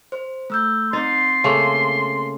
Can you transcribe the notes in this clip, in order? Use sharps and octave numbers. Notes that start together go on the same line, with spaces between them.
C5
A3 E6 G6
C4 D#4 C6 A6
C#3 A3 A#3